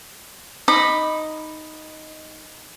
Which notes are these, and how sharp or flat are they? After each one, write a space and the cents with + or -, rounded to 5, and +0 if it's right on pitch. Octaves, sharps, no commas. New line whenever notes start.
D#4 +0 B5 +0 D6 +40